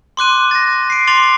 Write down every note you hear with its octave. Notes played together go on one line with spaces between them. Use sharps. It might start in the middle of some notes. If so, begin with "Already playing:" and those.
C6 D6 F#6 D#7
A6 A#6
C7 D7
C6 D6 A6 F7